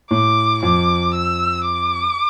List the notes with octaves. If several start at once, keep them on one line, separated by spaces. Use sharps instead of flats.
A2 D6
F2 D6
E6
D6